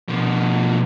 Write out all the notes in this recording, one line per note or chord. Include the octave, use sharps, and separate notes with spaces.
B2 F3